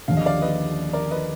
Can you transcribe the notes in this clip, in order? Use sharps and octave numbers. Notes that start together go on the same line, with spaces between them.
D#2 D3 F3 F5
D#5
D5 F5
B4 D#5
A#4 D5
B4 D#5